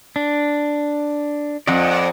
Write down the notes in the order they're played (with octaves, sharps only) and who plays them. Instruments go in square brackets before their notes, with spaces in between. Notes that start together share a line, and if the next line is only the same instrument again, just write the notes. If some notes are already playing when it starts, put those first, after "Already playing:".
[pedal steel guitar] D4
[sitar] F2 [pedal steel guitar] D5 D#5 F#5